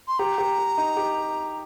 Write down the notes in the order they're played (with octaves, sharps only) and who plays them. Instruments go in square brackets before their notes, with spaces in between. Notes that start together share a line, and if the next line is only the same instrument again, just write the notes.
[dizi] C6
[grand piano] G4 [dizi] A#5
[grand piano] G4
G4
D#4
G4